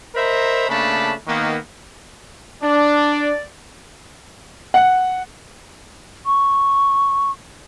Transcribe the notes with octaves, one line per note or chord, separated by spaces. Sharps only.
A#4 C5 D#5 E5 A#5 B5
C#3 A3 A#3 D4 A5 B5
D#3 A#3 B3
D4 D5
F#5
C#6